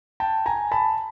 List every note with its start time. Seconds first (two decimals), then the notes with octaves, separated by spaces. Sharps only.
0.20 G5 A5
0.46 G#5 A#5
0.72 A5 B5